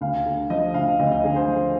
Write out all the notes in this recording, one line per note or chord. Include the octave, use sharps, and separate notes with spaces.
D2 F5
D3
F3 D#5
D2 F5
D2 D#5
D#5
D3 G#4
C5
F3